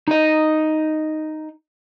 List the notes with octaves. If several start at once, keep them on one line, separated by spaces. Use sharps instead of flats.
D#4 D#5